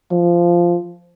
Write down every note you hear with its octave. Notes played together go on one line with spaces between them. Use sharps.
F3